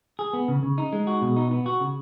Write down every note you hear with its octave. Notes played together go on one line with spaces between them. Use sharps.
G#4
B3
C#3
C#3
D#4
G#3
F#4
B2
D#4
B3
F#4
C#3